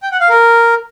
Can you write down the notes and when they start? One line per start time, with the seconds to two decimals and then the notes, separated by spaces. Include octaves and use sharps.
0.03 G5
0.12 F#5
0.20 F5
0.29 A#4